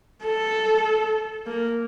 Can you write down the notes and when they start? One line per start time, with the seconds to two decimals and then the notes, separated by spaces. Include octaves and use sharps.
0.24 A4
1.47 A#3